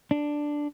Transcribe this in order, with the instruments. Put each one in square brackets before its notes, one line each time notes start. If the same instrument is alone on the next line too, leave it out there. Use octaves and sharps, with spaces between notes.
[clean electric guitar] D4